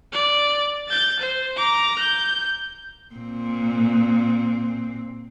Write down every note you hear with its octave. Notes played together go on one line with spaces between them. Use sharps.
D5
G6 A6
C5
A#5 D6
G6
A#2 C4